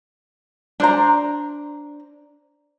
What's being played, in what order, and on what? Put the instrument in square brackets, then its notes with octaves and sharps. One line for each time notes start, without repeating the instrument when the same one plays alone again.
[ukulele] D4 C5 A#5